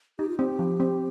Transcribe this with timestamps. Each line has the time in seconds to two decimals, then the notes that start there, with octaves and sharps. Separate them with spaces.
0.19 D#4 G4
0.28 F4
0.39 C4 G4
0.59 F3
0.80 C4